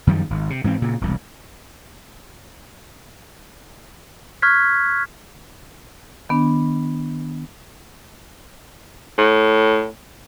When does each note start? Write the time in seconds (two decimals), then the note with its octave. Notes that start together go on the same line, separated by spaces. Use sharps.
0.07 F#2 D#3 F3 G3
0.30 G#1
0.50 C3
0.64 G#2 E3 A3 C4
0.82 A#2 C#3
1.01 E1 C2
4.42 C#6 F6 F#6 G#6 B6
6.29 D#3 B3 D4
9.18 A2